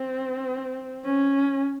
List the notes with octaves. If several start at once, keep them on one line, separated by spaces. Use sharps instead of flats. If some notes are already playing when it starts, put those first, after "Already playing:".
Already playing: C4
C#4